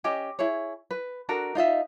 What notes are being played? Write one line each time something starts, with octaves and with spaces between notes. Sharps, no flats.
C#4 G4 D#5 G#5
E4 G#4 C#5
B4
D4 F#4 A4 A#4
D#4 F4 D#5 E5